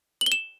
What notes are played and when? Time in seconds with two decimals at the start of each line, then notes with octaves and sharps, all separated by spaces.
0.21 F#7
0.26 G7
0.32 E7